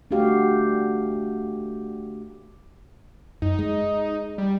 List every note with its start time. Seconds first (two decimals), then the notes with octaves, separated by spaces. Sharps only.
0.11 A3 D4 F#4 G4 F5
3.42 F#2 D#4
3.59 G#3
4.38 G3